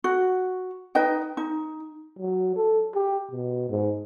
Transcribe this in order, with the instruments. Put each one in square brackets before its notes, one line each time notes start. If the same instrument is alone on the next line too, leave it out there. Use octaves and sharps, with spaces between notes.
[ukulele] F#4
D#4 B4 D#5 G5
D#4
[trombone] F#3
A4
G4
B2
G#2